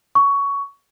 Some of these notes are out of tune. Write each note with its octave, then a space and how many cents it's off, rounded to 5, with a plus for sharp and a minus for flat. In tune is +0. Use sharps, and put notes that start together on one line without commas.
C#6 +15